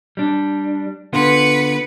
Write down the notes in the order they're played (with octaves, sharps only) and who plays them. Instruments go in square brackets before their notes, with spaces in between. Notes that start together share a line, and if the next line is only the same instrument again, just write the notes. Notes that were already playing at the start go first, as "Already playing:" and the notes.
[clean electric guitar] G3 D4
[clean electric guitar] D3 B3 F4 [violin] B4 C#7